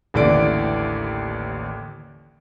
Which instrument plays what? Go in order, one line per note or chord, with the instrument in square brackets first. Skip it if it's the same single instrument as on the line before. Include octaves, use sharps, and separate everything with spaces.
[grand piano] A1 D#2 D3 E3 D5 D7